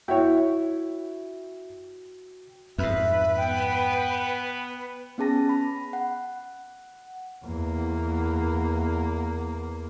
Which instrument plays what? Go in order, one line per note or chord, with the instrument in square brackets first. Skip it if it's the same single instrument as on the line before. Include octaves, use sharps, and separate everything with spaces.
[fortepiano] E4 C#5 [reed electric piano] F#4 G5
[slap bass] F2 G#2 [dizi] B4 [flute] E5
[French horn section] B3 [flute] G5
[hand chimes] B3 C#4 G#4 A5 A#6
B5
F#5
[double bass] E2 A#3